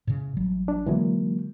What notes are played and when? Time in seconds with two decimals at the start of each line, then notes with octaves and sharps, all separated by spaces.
0.07 A2 C#3
0.37 A1 F#3 G3
0.68 D4
0.86 D3 E3 F#3 G#3 A#3